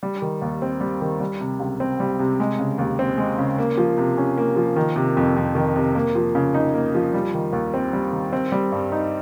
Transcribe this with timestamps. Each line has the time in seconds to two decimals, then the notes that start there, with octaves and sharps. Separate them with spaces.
0.03 G3
0.22 D#3
0.42 D#2
0.62 C4
0.81 G3
1.01 D#3
1.20 G3
1.41 C3
1.60 C#2
1.80 C4
2.00 G3
2.19 C3
2.40 G#3
2.59 C#3
2.78 D#2
2.99 C4
3.18 G#3
3.38 C#3
3.58 A#3
3.78 F3
3.98 C3
4.18 C#4
4.38 A#3
4.56 F3
4.76 D#3
4.96 C3
5.17 F2
5.36 F2
5.55 D#3
5.76 C3
5.95 A#3
6.15 F3
6.35 C#3
6.54 D#4
6.74 A#3
6.95 F3
7.14 G3
7.34 D#3
7.53 D#2
7.74 C4
7.93 G3
8.12 D#3
8.33 C4
8.52 G3
8.72 G2
8.92 D#4